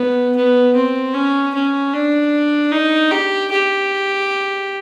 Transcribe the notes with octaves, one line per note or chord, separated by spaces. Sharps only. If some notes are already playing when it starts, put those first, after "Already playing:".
Already playing: B3
B3
C4
C#4
C#4
D4
D#4
G4
G4